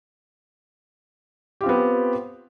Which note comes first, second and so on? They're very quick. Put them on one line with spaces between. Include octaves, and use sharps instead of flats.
G4 F4 C4 B3